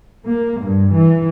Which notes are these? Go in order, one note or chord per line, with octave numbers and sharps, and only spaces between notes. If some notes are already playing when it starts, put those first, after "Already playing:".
A#3
G2
E3